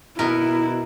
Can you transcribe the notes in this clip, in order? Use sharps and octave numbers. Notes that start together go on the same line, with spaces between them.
B2 E4 A#4